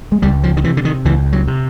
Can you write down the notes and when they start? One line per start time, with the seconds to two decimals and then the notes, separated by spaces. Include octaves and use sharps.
0.12 G#3
0.22 C#2 G3
0.43 F3
0.57 D#3
0.64 C3 E3
0.77 D3
0.85 D#3
1.05 C#2 E3
1.32 F#3
1.47 C3